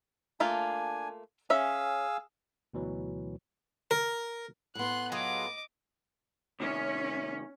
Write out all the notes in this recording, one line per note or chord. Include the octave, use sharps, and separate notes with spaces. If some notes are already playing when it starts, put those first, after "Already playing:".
A3 A#3 D4 F4 G#5
C#4 G#4 E5 F5 E6
D2 B2 E3 F#3
A#4
A2 B3 C6 F#6
F#3 F4 G#4 D#5 D6
A2 C3 D#3 C#4